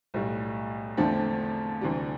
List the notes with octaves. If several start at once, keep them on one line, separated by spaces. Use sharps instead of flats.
B1 A2 G3
E2 D3 F3 A3 C4
D2 C3 E3 G3